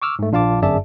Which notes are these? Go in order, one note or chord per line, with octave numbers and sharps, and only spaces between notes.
C#6 D6 E6 F6
G#2 A3
A#1 D4 F4 F5 A5 D6
G1 F#2 G#4 D5 E5 A5